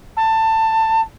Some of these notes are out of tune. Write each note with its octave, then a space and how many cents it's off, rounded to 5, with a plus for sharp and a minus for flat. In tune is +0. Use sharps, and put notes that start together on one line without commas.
A5 +20